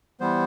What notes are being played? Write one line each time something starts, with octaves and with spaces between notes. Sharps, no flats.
E3 G3 B3 C5